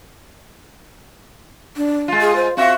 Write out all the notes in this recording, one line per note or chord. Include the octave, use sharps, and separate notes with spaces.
D4
G#3 F4
G#4
C5
C4 F#4 E5 F5